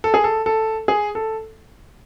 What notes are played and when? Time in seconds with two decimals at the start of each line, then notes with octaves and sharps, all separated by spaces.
0.04 A4
0.14 G#4
0.24 A4
0.46 A4
0.88 G#4
1.15 A4